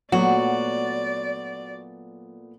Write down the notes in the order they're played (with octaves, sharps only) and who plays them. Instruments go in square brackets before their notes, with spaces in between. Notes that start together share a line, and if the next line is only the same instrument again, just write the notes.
[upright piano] A#2 A3 B3 [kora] F#3 [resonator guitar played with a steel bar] F#4 [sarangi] D5